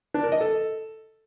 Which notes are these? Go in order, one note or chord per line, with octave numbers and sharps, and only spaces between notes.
D4
A#4
D#5
A4